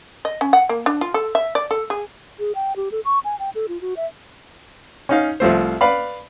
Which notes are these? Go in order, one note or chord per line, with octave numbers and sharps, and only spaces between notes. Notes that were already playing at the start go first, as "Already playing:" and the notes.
D#5
C#4
F#5
A#3
D4
F4
A4
E5
D5
A4
G#4
G#4
G5
G4
A4
C#6
G#5
G5
A4
F4
F#4
E5
C#4 D#4 F5
C2 F3 A3 C5
B4 D5 F5 B5